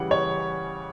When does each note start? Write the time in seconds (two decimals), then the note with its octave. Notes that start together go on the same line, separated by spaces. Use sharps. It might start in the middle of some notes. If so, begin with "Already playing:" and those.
Already playing: C#3 E3 G3 F#5
0.11 C#5